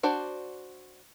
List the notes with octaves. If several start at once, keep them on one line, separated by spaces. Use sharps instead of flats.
D4 F#4 C5 D5